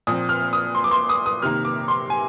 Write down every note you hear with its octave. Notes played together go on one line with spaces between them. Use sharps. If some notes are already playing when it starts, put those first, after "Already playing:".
A#2 F3 C4 D#6
F6
D#6
C6
D6
C6
D#6
D#6
C3 D#3 A#3 F6
D6
C6
G#5